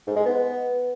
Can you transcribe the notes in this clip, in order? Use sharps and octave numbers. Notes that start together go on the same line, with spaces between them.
G#2
G#3
B3